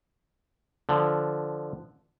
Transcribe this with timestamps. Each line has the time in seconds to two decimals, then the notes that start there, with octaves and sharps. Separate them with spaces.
0.89 D3 F3